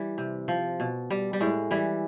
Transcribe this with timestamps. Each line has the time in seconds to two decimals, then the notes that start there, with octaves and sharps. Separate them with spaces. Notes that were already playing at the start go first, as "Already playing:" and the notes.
Already playing: E3 G3
0.18 C3
0.48 F3
0.80 B2
1.10 G3
1.33 G3
1.40 A2 G#3
1.71 E3 G3